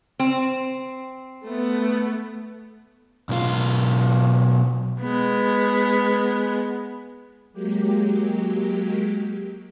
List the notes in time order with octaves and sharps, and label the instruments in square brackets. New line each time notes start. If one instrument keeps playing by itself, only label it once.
[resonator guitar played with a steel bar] C4
[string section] A3 B3
[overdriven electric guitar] B1 F4
[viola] G#3 B3
[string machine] F#3 G#3 A#3 G4